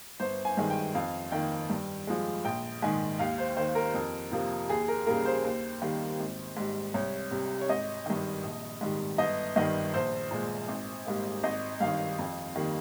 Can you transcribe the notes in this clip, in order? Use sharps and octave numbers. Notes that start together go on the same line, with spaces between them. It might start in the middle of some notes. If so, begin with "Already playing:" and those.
G1 C5
G#5
G2 D#3 G#3
G5
F2 F5
D#3 A#3 G5
G2
F3 G#3
A#1 G5
G#2 D#3 G#5
D#2 F5
C5
D#3 A#3 C5
A#4
F2
C3 F3 A#3
D#2 G#4
A#4
C#3 G3 A#3 A#4
C5
D#2
D#3 G3 A#3
G#1
G#2 G3
C2 C#5
C3 G3
C#5
G#1 D#5
G2 D#3
A#1
G#2 D#3 G3
G1 D#5
G2 D#3 G3 D#5
A#1 C5
A#2 G#3
G#1
G#2 G3 A#3
G#1 D#5
G2 D#3 F5
F2
D#3 G3 A#3